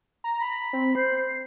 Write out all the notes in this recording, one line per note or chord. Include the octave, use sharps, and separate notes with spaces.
A#5
B5
C4
C5 C7